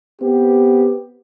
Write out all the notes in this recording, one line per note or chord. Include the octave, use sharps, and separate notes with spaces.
B3 C4 G4